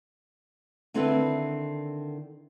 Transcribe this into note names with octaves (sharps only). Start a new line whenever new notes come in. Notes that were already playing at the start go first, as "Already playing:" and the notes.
D3 D#3 C4 E4 A4 B4